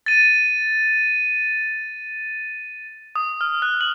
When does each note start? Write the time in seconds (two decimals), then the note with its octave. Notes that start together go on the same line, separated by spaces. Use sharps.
0.06 A6 D#7
3.16 D#6
3.41 F6
3.62 F#6
3.81 F#7